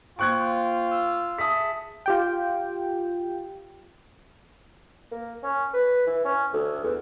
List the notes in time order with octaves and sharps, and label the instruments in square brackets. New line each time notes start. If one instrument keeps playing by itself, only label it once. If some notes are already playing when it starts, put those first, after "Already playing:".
[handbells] A#3 C5 G5 [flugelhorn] F4 [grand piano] C#6 F#6 G#6
[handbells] E6
[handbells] G#4 E5 A5 [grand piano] D#6 B6
[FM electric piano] F4 G4 G5
[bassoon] A#3
C#4
B4
E3
C#4
D2
E2